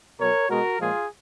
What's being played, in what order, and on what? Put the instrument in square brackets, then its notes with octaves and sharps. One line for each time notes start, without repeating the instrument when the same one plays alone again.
[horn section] B2 F#3 A#4 C#5
B2 G#3 F#4 A#4
A#2 F3 G#3 F4 G#4